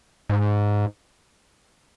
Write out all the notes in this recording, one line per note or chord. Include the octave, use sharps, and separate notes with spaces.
G#2